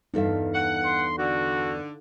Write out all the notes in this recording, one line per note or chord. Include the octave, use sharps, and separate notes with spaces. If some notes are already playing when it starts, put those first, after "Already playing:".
E2 G2 D#4 A4 E5 F5
F#5
C6
D3 F#4